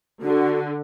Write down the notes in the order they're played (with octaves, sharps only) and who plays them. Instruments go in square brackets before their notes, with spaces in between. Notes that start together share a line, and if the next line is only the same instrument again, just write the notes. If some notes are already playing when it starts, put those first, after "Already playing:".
[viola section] D3 [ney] F#4